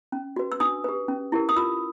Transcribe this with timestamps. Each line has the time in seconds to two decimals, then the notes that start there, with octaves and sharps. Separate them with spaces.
0.12 C#4
0.36 F#4 B4
0.52 E6
0.60 D4 D#6
0.84 G4 B4
1.08 C#4
1.32 E4 G4 A#4
1.49 D#6
1.56 F4 E6